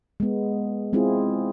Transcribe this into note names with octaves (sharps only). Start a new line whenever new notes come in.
G#3 B3
G#3 C4 E4 F4 G#4